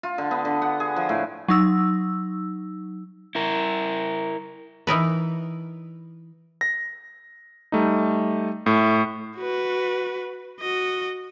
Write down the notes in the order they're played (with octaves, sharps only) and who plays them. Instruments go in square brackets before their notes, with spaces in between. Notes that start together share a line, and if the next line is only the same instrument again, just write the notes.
[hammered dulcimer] F4
D3
B3
D3
F#5
G#4
F3
A2
[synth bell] F#3 D#4 E6
[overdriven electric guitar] E4 A#4
[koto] E3 D#4 A#4 B4
[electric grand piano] A#6
G3 A3 D#4
A2 A3
[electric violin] F#4 B4
F#4 D#5